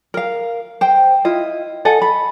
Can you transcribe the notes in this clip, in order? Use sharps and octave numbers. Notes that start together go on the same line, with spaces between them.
A#4 F5
C5 G5
E4 F4 D#5
A4 D#5 F#5 G#5
B5